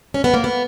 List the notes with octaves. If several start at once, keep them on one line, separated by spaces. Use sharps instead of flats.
C#4
B3
A#3
B3